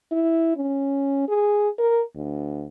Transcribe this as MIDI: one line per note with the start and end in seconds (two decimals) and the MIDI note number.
0.12 0.53 64
0.56 1.26 61
1.28 1.69 68
1.78 2.02 70
2.15 2.66 38